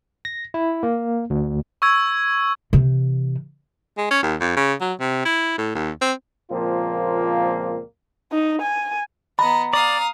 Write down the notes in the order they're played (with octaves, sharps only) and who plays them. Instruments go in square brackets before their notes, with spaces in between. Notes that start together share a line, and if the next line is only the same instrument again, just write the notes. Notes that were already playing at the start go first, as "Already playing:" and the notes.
[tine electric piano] A#6
E4
A#3
D2
[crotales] C#6 E6 G#6
[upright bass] C3 E3
[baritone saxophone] G#3
C#4
D#2
F2
C#3
F#3
C3
E4
A2
D#2
C4
[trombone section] C#2 A#2 F3 A#3 C4 F4
[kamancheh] D#4
G#5
[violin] B3 D#5 [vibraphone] A#5 [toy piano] B5
[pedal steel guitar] D5 [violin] F5 D#6